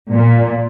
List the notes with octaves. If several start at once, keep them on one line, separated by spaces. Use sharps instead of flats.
A#2